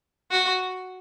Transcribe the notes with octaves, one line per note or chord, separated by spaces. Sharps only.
F#4